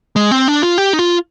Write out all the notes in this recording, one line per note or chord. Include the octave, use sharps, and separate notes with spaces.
G#3
C4
D4
F4
G4
D#4
F4